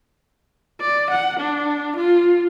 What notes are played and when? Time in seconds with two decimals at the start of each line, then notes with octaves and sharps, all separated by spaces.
0.81 D5
1.11 F#5
1.40 D4
1.97 F4